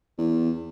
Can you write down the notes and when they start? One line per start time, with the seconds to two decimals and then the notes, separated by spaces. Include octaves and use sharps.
0.18 E2